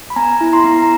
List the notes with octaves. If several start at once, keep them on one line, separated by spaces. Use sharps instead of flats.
B5
B3 G#5 A#5
E4
A#5 C6
B3
A#5